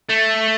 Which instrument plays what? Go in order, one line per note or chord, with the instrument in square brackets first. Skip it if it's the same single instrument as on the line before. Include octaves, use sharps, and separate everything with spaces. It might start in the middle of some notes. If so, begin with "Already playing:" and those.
[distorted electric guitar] A3